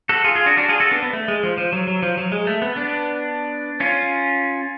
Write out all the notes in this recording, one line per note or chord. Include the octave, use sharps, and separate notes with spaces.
F#4 A4
F4 G#4
F4 G#4
D4 F#4
D4 F#4
F4 G#4
F#4 A4
B3 D4
B3
A3
G#3
F3
F3
F#3
F#3
F3
F#3
G#3
A3
B3
B3 D4
C#4 F4